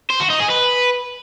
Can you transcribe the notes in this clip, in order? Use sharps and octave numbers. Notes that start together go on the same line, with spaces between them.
C5
F#4
D#4
G#4
B4